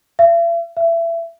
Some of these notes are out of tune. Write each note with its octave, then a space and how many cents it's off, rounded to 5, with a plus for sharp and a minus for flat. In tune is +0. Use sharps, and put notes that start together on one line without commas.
E5 +45
E5 +25